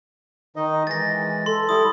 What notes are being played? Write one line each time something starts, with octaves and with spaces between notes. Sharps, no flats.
D#3 D#4 D#5
E3 G#3 A6 A#6
A4 C6
G3 E4 D#6